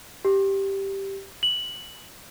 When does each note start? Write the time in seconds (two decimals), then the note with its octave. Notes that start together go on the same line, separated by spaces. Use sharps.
0.25 G4
1.43 F#7